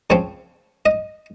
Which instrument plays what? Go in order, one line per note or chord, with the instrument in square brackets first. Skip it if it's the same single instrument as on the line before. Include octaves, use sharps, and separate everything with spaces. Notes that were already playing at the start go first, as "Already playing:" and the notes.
[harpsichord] C#3 F3 C4 C#5
D#5